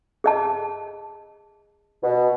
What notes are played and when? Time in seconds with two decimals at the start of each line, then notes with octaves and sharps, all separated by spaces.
0.24 G#4 D#5 A5
2.03 B2